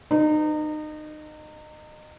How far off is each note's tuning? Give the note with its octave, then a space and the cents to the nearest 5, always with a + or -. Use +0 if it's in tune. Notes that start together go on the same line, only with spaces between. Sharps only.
D#4 -30 B4 +35